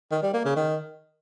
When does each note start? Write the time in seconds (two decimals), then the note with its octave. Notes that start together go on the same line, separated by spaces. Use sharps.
0.11 D#3
0.22 G3
0.34 A#3
0.45 C#3
0.56 D#3